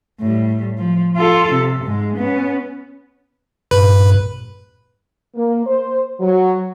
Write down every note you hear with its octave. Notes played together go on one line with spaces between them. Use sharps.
A2 G3
F3
F4 A4
C3
G#2 G#3
B3 C#4
G2 A#2 B4
A#3
C5
F#3